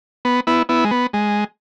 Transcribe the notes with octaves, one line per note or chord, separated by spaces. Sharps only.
B3
B3 E4
B3 E4
G#3
B3
G#3